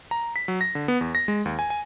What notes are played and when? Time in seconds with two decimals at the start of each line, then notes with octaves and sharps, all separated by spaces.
0.11 A#5
0.36 B6
0.48 F#3
0.61 A#6
0.75 D3
0.88 B3
1.01 E2
1.15 A#6
1.28 G#3
1.45 D#2
1.59 G#5
1.70 G#5